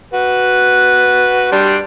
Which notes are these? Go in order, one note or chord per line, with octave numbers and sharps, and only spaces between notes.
F#4 B4
G3 D4 C6